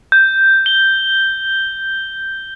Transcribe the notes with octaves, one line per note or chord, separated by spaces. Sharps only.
G6
G7